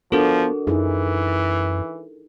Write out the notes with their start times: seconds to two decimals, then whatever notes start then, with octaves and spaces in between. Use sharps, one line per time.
0.12 F3 B3 D4 F#4 A4 A#4
0.67 F#2 E3 D#4 E4 G#4